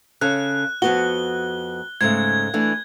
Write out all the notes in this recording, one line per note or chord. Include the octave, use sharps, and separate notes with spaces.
C#3 C#4 A4 F#6
F2 B3 F#4 G7
G#2 C#3 A3 G#6
E3 A3 D4